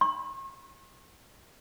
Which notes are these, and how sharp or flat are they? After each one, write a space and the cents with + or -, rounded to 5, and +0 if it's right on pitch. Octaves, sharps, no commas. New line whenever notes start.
C#6 -45